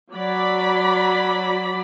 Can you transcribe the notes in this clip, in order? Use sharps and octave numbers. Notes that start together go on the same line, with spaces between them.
F#3 D5 B5